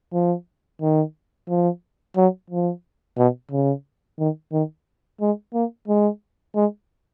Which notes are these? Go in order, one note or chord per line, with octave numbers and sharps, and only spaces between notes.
F3
D#3
F3
F#3
F3
B2
C#3
D#3
D#3
G#3
A#3
G#3
G#3